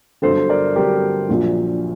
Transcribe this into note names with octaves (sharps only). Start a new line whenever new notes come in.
G1 G2 F#3 A4 C5
A#4 D5
G1 G2 F#3 G4 A#4
A#1 A#2 F#3